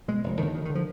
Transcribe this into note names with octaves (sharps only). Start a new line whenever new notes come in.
B2 G#3
F1
D#2 D3 D#3
D2 D#3
D#3
D3
F3